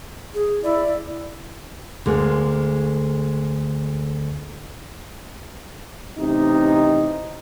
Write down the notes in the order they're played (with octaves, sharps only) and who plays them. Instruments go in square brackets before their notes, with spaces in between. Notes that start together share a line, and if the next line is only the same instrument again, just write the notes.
[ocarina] G#4
[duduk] E4 [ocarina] D5
[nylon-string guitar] D2 G#3 A#3
[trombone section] A1 C3 D#4